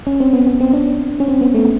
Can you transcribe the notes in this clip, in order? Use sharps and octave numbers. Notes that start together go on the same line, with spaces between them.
C#4
C4
B3
B3
C4
D4
C#4
C4
B3
A3